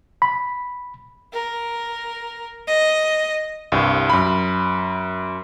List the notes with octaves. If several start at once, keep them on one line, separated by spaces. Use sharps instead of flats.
B5
A#4
D#5
C2 G2
F#2 B5